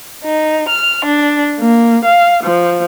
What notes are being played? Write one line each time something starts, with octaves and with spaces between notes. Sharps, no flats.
D#4
F6
D4
A#3
F5
F3